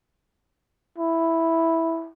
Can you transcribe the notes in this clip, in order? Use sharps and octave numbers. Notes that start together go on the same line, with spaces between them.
E4